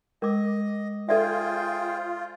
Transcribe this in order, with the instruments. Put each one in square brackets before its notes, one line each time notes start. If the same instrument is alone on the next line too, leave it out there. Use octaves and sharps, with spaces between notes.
[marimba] G#3 [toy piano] A#4 D6 [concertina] D#5
[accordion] F4 [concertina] G#4 C5 G5 [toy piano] A4 D5 E5